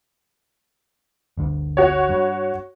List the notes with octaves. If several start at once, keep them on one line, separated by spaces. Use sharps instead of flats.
G1 D2 D3
F#4 C#5
G2